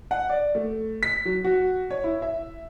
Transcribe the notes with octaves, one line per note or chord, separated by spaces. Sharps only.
F#5
D5
A3
B6
F#3
F#4
C#5
E4
E5